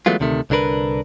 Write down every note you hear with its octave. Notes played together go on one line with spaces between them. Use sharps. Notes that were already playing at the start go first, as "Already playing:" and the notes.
E3 F#3 G#3 A3 B3 F4
D2 C3 D#3 A3
C2 D3 D4 A#4 B4